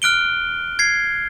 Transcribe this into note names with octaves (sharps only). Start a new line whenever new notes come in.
F6 F#6 D7 G7
G#6 C7